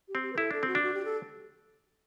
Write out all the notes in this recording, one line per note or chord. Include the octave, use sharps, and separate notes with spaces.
G4
C4
G4
B4
E4 A4
D4 A4
C4 F#4
D4
F#4
G4
A4